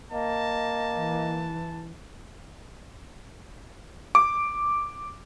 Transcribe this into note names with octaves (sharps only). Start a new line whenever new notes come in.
A#3 D#5 A5
E3
D6